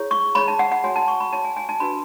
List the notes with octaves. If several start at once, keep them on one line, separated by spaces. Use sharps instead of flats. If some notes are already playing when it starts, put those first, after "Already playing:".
Already playing: E4 G#4 C#5
C#6
E4 G#4 C#5 B5
A5
F#5
F#5
F#4 C#5 G#5
A5
C#6
B5
F#4 C#5 A5
G#5
G#5
A5
D4 F#4 B4 B5